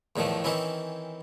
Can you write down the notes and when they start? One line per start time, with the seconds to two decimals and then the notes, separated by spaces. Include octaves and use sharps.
0.16 E2 A2 D#3 F3 A3
0.44 D#3 E3 C4 C#4 E4